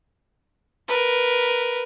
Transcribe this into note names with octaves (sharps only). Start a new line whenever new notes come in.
A#4 B4